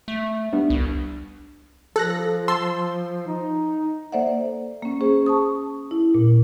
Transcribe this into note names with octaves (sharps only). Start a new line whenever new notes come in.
A3
G3 B3 D4
C2
F3 A4 F#6 A#6
A5 C6 E6
D#4
A#3 A4 C5 D5 E5 F#5
A#3 C#4
C#4 G#4 C5
A5 C#6 D#6
E4
A#2